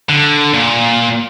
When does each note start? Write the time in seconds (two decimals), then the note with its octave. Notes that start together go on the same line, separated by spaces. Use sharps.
0.09 D3
0.54 A#2